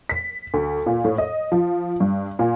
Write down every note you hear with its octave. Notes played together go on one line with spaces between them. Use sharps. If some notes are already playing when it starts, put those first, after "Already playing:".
B6
D2
A#2
A2
D#5
F3
G2
A#2